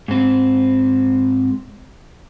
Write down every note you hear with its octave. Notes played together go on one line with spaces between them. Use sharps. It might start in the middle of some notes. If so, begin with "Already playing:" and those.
G#2 C4